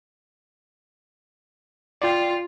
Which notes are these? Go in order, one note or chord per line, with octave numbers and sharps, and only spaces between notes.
F4 D5 G5